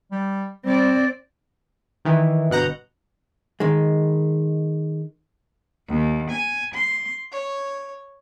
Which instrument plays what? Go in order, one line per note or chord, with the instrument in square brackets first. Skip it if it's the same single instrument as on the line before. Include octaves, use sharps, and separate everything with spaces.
[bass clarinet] G3
[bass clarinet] G3 [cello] C4 D5
[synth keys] D#3 E3
G1 B2 F#5 A#5 G6
[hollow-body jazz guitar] D#3 G#3
[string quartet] D#2
G#5
C6
C#5